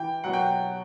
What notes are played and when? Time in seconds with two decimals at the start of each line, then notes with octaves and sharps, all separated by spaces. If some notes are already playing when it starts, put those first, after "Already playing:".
Already playing: E3 G5
0.24 B2 F#3 F#5
0.33 G5